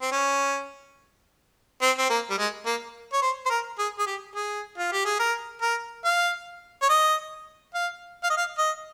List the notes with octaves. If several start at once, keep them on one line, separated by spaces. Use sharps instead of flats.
C4
C#4
C4
C4
A#3
G3
G#3
A#3
C#5
C5
C5
A#4
G#4
G#4
G4
G#4
F4
G4
G#4
A#4
A#4
F5
C#5
D#5
F5
F5
D#5
F5
D#5